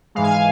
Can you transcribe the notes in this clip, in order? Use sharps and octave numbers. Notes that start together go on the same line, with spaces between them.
G#2 E3 G#3 F5
G#5
F5